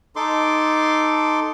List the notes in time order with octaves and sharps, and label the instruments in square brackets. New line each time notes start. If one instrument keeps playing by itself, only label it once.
[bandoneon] D#4 A4 C6 D6